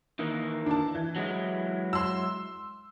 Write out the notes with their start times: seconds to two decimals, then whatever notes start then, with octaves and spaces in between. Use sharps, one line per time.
0.19 D#3 E3 A#3
0.66 D4 A5
0.95 E3
1.16 F#3 G#3 E4
1.93 C6 E6